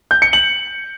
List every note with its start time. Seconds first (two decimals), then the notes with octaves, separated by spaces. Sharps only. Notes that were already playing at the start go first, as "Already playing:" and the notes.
0.11 G6
0.22 C#7
0.33 F#7